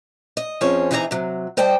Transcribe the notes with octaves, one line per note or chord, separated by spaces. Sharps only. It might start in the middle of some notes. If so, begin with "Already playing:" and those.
D#5
F2 F3 C4 C#4 G#4 C#5
C3 E3 D#4 G#4 D#5 A#5
C3 F#3
G3 C5 D#5 G5 A5